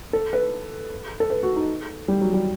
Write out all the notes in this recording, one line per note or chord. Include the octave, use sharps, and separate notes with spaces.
A4
B4
A4
B4
F#4
D#4
G3
F#3
G3